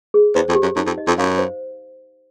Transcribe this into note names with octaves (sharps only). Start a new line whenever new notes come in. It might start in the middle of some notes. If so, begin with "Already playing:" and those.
G#4
E2 C5
F2
G4
F#2
F#2 D#4
F2
D#5
F2
F#2 F5
C5